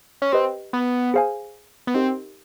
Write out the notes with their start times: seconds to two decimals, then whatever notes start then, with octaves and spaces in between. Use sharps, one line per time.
0.22 C#4
0.32 C4 G4 B4 D#5
0.73 B3
1.14 G#4 C5 F5 G#5
1.87 B3
1.94 C4 D#4 G4 A#4 D#5 F#5